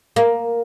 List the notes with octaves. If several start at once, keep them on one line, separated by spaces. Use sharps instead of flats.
A#3